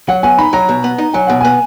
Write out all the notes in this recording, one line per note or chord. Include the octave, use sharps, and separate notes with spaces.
F#3 F#5
B3 G#5
D#4 B5
F#3 A#5
B2
B3
D#4
F#3 G#5
B2 F#5
B3 G#5